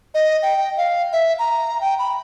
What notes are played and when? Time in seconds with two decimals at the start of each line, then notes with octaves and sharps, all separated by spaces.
0.14 D#5
0.42 G5
0.77 F5
1.13 E5
1.39 A#5
1.81 G5
1.99 B5